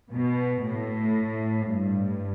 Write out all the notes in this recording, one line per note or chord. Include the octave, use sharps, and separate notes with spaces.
B2
A2
G2